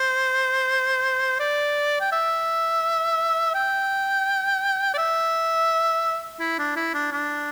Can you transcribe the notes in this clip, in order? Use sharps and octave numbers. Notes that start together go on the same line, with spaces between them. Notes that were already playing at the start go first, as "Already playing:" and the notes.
Already playing: C5
D5
G5
E5
G5
D5
E5
E4
D4
E4
D4
D4